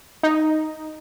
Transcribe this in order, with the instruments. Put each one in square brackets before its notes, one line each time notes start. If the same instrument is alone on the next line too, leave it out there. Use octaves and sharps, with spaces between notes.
[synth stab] D#4